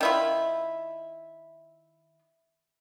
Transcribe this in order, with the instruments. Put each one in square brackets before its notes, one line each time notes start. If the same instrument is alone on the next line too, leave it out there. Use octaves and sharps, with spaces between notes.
[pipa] D#3 E4 F4